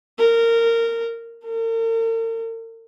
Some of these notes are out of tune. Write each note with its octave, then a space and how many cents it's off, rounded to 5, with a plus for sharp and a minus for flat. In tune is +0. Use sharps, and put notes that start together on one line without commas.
A#4 -20
A#4 -45